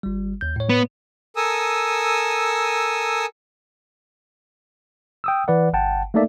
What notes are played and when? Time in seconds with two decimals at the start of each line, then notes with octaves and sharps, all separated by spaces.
0.03 G1 G3
0.41 D#2 G6
0.56 A2 C#5
0.69 B3
1.36 A4 A#4 G#5 D#6 E6
5.24 G5 D#6 E6
5.48 E3 B4 D5 F#5
5.73 G1 F#5 G5 A5
6.14 A3 A#3 D#4 A4 D5 E5